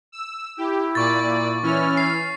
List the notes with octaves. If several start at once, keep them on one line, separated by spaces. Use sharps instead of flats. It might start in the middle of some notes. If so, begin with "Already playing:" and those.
E6
E4 G4
A#2 D5 C#6 A6
E3 C#4 E4 F6
C7